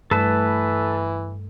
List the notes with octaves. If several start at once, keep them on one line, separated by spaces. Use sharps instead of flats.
G2 E3 A3 A4 B4 A5